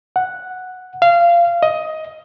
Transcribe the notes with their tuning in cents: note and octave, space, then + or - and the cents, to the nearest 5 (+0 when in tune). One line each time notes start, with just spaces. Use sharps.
F#5 +0
F5 -20
D#5 +15